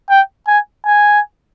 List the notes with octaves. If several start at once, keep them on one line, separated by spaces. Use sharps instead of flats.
G5
G#5
G#5